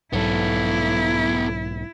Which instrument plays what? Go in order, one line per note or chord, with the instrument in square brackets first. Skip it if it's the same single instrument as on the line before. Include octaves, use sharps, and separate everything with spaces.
[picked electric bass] B1 G#2 F#3 [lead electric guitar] B3 A4 [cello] E4